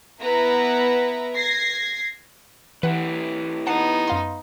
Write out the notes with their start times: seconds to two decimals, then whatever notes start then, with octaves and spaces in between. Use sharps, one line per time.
0.21 B3 E4 B4 A#5
1.36 G#6 A#6 C7
2.83 E3 E4 G4 B4 F#5
3.67 B3 D#4 F#5 A5 C7
4.07 F#2 F5 C6